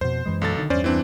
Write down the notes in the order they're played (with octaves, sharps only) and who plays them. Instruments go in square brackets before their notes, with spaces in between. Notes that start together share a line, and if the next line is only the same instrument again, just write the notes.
[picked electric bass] F2 B2 [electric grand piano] C5
[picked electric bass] F#2 E3 G#3
[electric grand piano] B1 A4 A6
[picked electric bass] D3 D#3
[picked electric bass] E2 G2 [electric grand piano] C#4 C5 D5
[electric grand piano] E3 C4 D4